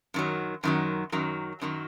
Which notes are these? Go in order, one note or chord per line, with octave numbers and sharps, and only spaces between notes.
F#2 D#3 F#3
F#2 D#3 F#3
F#2 D#3 F#3
F#2 D#3 F#3